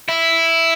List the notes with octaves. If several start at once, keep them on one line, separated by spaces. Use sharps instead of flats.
E4